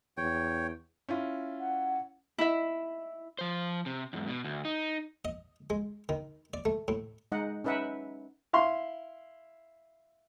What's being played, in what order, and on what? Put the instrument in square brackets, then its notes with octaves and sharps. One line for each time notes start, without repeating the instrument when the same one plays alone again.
[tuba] E2 [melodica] C#5 G5
[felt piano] C#4 E4 F4
[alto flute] F#5
[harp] E4 E5
[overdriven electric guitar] F3 C5
C3
E2 G#2
B2
D2
D#4
[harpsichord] D#5
G#3
D#3
D5
A3
A2
[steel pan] G#3 D#4 D#5 F#5
C#4 D#4 B4 E5 F#5
[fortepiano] E4 F5 C6